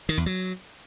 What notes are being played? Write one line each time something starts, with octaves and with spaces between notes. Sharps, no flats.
D#3
E2
F#3